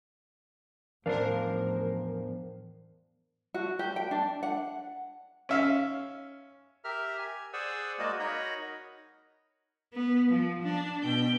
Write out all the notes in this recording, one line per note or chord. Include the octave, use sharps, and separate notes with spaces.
E2 A2 F3 D4 A#4 C5 F5
F#4
G4
G5
D4
F#5
C#4 E5 F5
G4 A#4 E5 F6
G#5
G#4 C5 D5 F#5 G#5 E6
G#3 A#3 F#4 D5 D#5
D#4 F#4 A#4 C#5 D#5 B5
B3
F3
D4
B2 G5